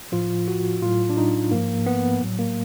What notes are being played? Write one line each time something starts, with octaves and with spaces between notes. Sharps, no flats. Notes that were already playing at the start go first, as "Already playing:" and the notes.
A2 F3 F4
F#4
A2 F#3 F4
D4
D#4
G#2 F3 A#3
B3
A2 F#3
A#3